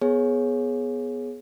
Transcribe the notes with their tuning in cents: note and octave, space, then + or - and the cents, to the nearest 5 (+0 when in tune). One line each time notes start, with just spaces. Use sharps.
B3 +0 G#4 +15 C#5 -5